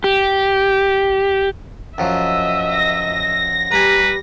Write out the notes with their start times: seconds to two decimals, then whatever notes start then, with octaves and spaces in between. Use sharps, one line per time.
0.04 G4
1.98 F#2 F3 F#3 D#5 E5
2.73 A#6
3.72 G3 B4 G#5 A#5